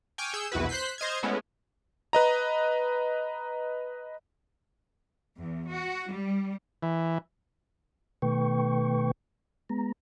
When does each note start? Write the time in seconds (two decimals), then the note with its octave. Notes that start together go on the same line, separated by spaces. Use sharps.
0.18 G5 G#5 C#6 D6 F6
0.33 G#4 E6 G6 C#7
0.52 B1 E2 E4 F#4 B4
0.69 C5 F#6 G6 B6 C7
0.98 C5 D#5 F6 G#6
1.23 G#3 A3 B3 C#4 E4
2.13 B4 D#5 A#5
5.38 E2
5.69 F#4
6.08 G3
6.83 E3
8.22 B2 D#3 A3 B4 G5 C#6
9.69 G#3 B3 A#5